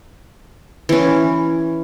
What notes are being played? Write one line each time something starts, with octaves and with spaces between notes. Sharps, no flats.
E3 C#4